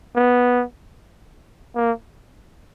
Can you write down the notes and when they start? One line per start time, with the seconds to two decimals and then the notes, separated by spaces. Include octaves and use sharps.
0.16 B3
1.76 A#3